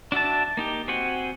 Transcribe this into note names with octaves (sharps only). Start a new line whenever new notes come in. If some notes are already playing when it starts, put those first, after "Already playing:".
D4 F#4 E5 A5
A#3 D#4 G4
C4 F#4 G4 F#5 G#5